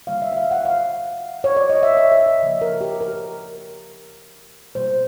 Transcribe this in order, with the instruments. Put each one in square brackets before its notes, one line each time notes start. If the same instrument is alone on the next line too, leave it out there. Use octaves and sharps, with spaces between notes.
[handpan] D3 G3 A#3 F5
E5
E5
F5
F#5
F5
C#5
D5
D#5
E5
E5
E5
D#5
C#3 F3 A#3
A#4
G4
A#4
B2 G3 A#3 C5